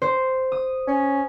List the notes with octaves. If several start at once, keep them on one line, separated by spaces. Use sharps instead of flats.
C5
D#6
C#4